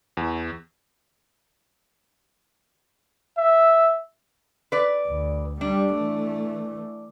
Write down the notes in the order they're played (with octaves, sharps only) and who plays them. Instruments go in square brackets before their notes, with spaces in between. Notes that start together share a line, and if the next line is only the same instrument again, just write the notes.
[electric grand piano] E2
[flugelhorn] E5
[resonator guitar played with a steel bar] B4 D5
[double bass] D2
[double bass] G3 [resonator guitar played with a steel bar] D4
[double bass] E3 A3